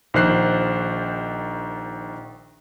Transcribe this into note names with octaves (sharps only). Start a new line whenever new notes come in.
A#1 D#3 C5 F#6 C7